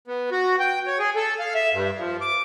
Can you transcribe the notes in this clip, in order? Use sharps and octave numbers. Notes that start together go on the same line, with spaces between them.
B3
F#4
G5
C#5
G#4
A4
F5
E5
G2
F3
D6